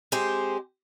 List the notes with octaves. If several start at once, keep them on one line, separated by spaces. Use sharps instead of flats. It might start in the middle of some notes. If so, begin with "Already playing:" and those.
G#3 C4 G4 C5